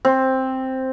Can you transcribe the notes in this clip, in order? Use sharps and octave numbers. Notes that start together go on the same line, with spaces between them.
C4